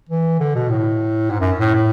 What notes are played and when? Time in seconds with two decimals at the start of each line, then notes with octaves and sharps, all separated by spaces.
0.09 E3
0.40 D3
0.55 B2
0.69 A2
1.30 G#2
1.41 F#2
1.60 A2
1.75 A2